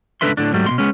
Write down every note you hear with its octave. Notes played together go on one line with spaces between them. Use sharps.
C#2 D4 A4 B4 E5 C6
A2 D3 D4
G#2 F#3 G3 A3
B2 A3 C6
G#3 B3 C#4